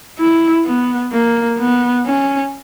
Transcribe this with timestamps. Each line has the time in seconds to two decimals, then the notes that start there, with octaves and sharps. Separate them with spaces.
0.19 E4
0.66 B3
1.13 A#3
1.59 B3
2.06 C#4